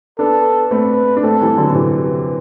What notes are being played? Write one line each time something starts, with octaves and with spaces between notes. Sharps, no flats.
B3 D4 A4
A3 C4 B4
D4
A3 C4 A4
E3 G3
D3 F#3
D3
C3 E3